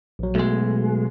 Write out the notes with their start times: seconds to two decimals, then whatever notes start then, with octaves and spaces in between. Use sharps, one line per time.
0.19 A#1 F#3
0.35 B1 B2 G#3 A3